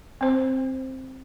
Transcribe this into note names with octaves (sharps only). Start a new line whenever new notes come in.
C4 C5